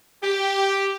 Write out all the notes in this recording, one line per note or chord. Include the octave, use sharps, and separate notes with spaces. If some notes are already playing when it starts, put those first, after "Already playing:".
G4